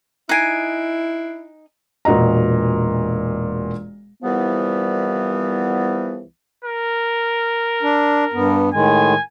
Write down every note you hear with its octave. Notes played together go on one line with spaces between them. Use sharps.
D#4 E4 G#5 F#6 C7 D7
E1 A#2 F#4 D#5 A#5
C2 E3 F3 G3 B3
A#4
D4
G2 B3
A2 D#3 G#3 G#5